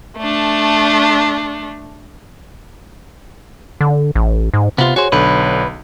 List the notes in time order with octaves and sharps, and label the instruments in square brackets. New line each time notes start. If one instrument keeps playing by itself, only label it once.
[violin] A3 D4
[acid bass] D3
A1
G#2
[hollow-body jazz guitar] C3 B5 C6 [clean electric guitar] B3 F4
[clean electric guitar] F#4 G#4 C5 [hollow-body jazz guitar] C#5
[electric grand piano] B1 D3 [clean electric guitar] B4